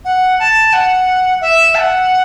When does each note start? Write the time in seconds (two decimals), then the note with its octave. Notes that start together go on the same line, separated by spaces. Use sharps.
0.05 F#5
0.40 A5
0.73 F#5
1.41 E5
1.75 A5
1.79 F#5